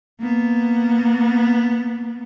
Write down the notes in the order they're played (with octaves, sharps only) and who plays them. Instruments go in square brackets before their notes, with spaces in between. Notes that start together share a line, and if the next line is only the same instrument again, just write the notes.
[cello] A#3 B3